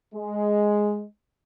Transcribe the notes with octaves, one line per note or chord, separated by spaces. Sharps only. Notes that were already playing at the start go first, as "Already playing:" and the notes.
G#3